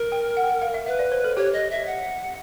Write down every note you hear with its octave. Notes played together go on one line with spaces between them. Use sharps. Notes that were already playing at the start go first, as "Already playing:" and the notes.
Already playing: A#4
G5
F#5
G5
F#5
F5
E5
B4 E5
D5
C5
A4
G4 C#5
D#5
E5
F#5